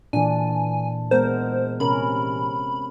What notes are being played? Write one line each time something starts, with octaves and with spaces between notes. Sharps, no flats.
A#2 E3 D4 G#5
G#3 B3 A#4 C5
C3 C#4 A#4 B5